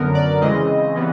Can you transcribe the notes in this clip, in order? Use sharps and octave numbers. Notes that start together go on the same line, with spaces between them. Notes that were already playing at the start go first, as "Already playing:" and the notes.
Already playing: F#2 D3 F#3 B3 A#4
D5
C#3 E3 G#3 C4 D#5
C#3 E3 G3 B3